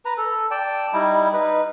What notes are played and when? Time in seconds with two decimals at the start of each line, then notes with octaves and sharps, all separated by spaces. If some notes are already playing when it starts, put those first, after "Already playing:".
0.05 B4 A#5
0.18 A4
0.51 D5 G5 A5
0.93 G3 D#4 E4
1.33 D#4 B4